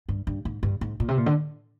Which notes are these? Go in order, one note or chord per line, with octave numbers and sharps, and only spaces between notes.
G2
G2
G#2
G2
G#2
A#2
C3
A#2
D3